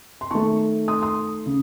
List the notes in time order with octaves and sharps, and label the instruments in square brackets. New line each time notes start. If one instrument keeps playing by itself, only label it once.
[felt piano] C6
D#3 A3 A5 C#6
C6 D#6
C6 D#6
C#3